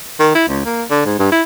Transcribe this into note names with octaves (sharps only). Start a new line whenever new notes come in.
D#3
E4
C#2
A#3
D3
G#2
G2
E4